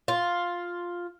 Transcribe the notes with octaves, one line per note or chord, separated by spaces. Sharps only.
F4